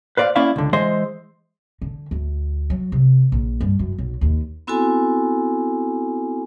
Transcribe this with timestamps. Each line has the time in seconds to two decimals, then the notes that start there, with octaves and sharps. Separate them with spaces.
0.17 B4 C5 D5 D#5 F5
0.36 A#3 C#4 E4 D5 E5 F5
0.56 C#2 D3
0.73 E3 G#3 C5 D#5 E5
1.82 D3
2.11 D2
2.70 F#3
2.92 C3
3.32 A#1
3.61 G2
3.79 F#2
3.98 B1
4.21 D#2
4.67 B3 C4 E4 F#4 A4 G#5